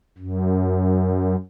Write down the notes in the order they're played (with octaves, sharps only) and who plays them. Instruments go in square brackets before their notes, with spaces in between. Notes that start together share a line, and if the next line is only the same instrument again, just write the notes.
[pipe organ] F#2